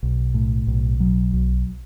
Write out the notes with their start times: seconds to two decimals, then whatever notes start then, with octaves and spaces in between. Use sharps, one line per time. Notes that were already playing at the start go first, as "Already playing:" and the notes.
0.03 B1
0.34 A2
0.67 B1
1.00 F#3
1.33 B1